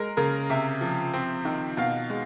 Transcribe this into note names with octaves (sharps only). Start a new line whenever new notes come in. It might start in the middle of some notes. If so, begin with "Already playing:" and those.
Already playing: G#3 A#4
C#3 A#4
C3 E5
F3
C4
D#3
B2 F5
G#3